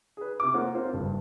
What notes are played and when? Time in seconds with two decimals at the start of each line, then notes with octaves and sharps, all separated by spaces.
0.17 G#4 B4
0.40 C3 D6
0.54 A#3 F4 C5 F#5
0.74 C4 F4 A#4 C5
0.93 F#1 G2